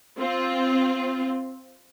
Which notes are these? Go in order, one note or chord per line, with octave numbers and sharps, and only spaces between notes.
C4 F4